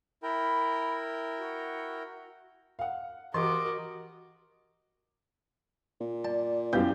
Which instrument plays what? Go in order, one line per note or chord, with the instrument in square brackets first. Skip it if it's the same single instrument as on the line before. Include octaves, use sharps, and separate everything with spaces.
[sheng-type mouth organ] E4 A#4 G5 [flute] B5
[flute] F#4
[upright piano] F5 F#5
[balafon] E3 [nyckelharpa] F#4 A#4 [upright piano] G4 C6 [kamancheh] D#5 D6
[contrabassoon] A#2
[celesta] D5 [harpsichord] A5
[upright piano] F#2 G4 G6 [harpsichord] B2 G3 [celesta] E4 F5